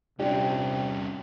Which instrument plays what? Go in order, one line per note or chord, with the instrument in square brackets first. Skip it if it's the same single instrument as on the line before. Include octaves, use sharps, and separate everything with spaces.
[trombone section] C3 [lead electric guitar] G3 C#4 [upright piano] D4 F4 [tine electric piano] G5